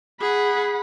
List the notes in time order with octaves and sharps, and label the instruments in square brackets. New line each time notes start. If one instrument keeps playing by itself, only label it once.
[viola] G#4 [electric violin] F#5 B5